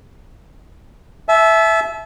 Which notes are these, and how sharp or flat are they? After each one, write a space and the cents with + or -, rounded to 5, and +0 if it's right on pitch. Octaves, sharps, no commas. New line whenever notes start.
E5 +0 A5 -40